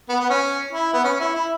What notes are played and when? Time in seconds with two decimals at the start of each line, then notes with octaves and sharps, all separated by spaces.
0.09 B3
0.20 B3
0.30 C#4
0.73 E4
0.93 B3
1.04 C#4
1.20 E4
1.35 E4